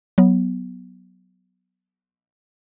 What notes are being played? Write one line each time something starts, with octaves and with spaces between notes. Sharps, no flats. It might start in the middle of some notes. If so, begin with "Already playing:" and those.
F#3 B3